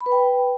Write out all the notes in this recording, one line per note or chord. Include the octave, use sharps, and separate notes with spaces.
B5
B4
G5